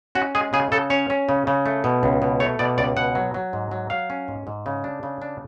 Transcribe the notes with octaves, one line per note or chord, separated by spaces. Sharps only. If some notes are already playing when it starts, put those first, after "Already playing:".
C#4 F#4
G#3 G#4
C#3 G#4
C#3 A4
C#4 C#5
C#4
C#3
C#3
A3
B2
C#2
B2
A3 C#5
B2 D5
C#2 D5
B2 F#5
F#3
F#3
G#2
F#3
F#3 F5
C#4
G#2
G#2
C#3
D4
C#3
D4